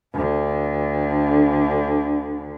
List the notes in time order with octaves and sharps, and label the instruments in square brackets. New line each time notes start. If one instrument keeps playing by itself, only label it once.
[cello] D2 D3